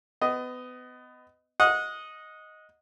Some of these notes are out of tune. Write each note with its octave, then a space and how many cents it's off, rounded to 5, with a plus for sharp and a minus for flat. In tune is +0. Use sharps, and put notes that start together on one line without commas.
B3 +30 D#5 +0
D#5 +0 F#5 -25